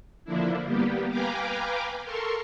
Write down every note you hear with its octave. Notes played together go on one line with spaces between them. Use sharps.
D3 F3 A#3 D4 E4
G3 A#3 B3 G4
B4 F5 G5 G#5 A#5 D6
A4 A#4 C6 C#6